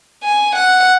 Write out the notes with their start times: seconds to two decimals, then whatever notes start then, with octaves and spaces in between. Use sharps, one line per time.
0.23 G#5
0.55 F#5